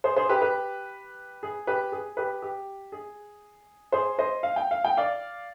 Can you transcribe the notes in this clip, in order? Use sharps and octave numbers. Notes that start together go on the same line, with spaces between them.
G#4 C5
G#4 C5
G4 B4
G4 B4
G#4
G4 B4
G#4
G4 B4
G4
G#4
G#4 C5
C5 D#5
F5
G5
F5
G5
D5 F5